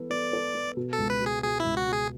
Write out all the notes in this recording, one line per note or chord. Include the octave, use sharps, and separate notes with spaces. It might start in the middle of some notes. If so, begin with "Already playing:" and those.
Already playing: E3 B3 A4
B3 D5
A4
B3
B2
A4
C#2
B4
B2 G#4
B2 G#4
E4
C#2
F#4
B2 G#4